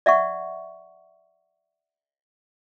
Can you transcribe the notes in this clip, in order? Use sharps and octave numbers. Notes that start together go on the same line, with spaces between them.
D5 E5 F#5 C#6